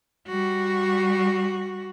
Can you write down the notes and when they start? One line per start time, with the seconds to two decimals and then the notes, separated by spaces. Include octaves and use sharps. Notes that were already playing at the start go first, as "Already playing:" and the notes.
0.28 G3 F#4